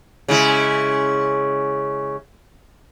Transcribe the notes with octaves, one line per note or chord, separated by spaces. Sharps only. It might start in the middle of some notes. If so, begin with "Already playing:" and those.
C#3 G#3 E4